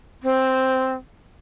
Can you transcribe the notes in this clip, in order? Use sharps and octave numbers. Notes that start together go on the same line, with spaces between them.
C4